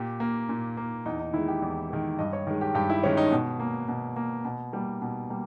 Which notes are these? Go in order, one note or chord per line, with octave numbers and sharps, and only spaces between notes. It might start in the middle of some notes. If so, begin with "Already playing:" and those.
Already playing: A#2 G4
A#3
A#2
A#3
E2 D#4
D#4
D#3 G#3 E4
G4
E2
D#3 G#3
G2 D#5
C#5
D#3 G#3
G4
G2 G4
E4
D#3 G#3 C#4
D#4
B2
A#3
B2
A#3
B2
G3 A#3
B2
G3 A#3